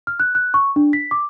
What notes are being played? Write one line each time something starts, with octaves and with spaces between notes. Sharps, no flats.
F6
F#6
F#6
C#6
D4
B6
D6